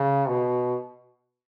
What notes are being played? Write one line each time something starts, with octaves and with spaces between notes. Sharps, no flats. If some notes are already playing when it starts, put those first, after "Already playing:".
Already playing: C#3
B2